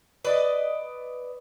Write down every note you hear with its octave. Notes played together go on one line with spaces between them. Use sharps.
B4 D5 D#5